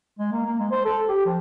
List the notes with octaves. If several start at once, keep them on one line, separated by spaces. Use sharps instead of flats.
G#3
A#3
A#3
G#3
C5
A4
G4
F3